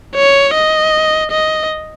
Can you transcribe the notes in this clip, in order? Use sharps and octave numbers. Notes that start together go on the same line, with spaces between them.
C#5
D#5
D#5